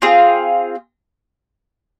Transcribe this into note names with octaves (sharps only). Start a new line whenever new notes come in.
C4 F4 G#4